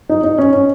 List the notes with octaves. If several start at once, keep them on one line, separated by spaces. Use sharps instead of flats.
D#4
D#4
C#4
C#4